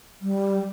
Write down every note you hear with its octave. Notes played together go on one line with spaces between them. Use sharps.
G3